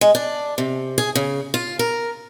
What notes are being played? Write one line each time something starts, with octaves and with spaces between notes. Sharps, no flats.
G#3
D4
C3
G#4
C#3
F4
A#4